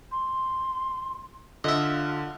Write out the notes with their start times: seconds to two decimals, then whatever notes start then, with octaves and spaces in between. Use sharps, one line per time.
0.12 C6
1.64 D3 F4 D#5 E5